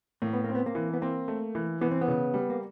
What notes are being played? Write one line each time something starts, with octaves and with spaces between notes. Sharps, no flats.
A2 A#3
B3
A#3 C4
B3
A#3
E3
B3
A#3 C4
A3
E3
E3 B3
C4
B3
C#3
G3
A#3